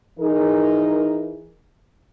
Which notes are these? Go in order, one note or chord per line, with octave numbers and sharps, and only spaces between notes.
E3 D#4 G#4 A#4